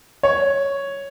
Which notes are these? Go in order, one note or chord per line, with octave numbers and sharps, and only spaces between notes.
C#5